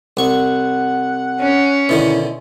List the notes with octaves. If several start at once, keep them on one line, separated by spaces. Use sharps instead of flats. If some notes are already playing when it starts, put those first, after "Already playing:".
C2 F#5 C#6
C#4
B2 D3 D#3 E4